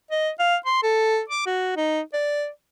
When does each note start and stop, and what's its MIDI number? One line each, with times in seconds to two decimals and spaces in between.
0.11 0.30 75
0.39 0.56 77
0.66 0.80 84
0.83 1.21 69
1.29 1.44 86
1.46 1.75 66
1.76 2.01 63
2.13 2.48 74